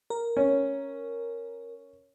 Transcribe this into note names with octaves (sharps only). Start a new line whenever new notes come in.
A#4
C#4